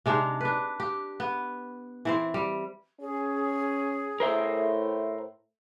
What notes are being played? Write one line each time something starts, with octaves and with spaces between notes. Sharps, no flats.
C3 G#3 D4 D#4
D4 B4
G4
B3
E3 C4 C5
G3
C#4 G#4
A2 A#4 C5 E5